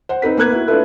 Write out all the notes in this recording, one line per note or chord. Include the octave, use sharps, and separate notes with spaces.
C5 F#5
C4 D#4 B4 B6
A#3 B3 B4 F#6 G#6
E4 F#4
A3 D4 F4 A4 B4 E5